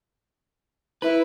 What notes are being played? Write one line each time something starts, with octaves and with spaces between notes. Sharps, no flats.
E4 B4